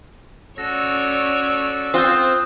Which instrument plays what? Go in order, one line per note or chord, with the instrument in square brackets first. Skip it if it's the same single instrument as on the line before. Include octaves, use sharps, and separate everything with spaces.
[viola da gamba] C#4 C#5 D5 [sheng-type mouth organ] F#4 A4 E6 [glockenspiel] A#6
[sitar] C4 F4 [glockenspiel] D#6 F#6 G6